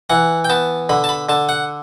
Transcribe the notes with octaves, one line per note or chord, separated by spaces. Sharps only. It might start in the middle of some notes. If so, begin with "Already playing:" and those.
E3 F#5
G5
B3 A5
D3 B5
A5
B5
D3 A5
F#5